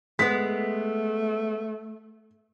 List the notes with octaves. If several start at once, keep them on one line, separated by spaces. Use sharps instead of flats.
G#3 A3 B3 B6